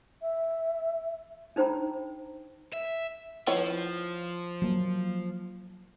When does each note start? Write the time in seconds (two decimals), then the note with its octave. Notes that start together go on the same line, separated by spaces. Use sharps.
0.22 E5
1.56 D4 D#4 C5 G5 A#5 B5
2.73 E5
3.47 F3 E4 B4 C#5
4.62 F#3 A#3